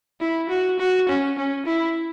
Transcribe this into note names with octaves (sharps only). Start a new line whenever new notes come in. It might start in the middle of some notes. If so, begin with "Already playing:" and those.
E4
F#4
F#4
C#4
C#4
E4